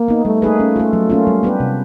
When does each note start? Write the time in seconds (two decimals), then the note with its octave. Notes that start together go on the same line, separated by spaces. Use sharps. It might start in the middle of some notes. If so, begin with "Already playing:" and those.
Already playing: A#3
0.08 B3 D#4
0.25 G3 A3
0.42 A#3 D#4 G#4 B4
0.60 C#4
0.76 F4 A4
0.93 F#3
1.10 A#3 C#4 F4
1.27 G3
1.43 B3 D4 G4 B4
1.60 C3